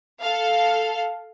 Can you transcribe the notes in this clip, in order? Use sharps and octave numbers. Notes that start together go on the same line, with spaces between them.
A4 F5